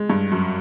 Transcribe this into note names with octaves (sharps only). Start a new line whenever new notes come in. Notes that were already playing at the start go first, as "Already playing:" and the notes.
Already playing: G#3
G2
F#2